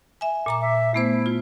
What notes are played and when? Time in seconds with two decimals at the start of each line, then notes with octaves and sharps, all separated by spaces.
0.21 E5 G#5
0.46 A#2 A#5 D6
0.61 E5
0.94 A3 B3 E4 C5
1.26 F4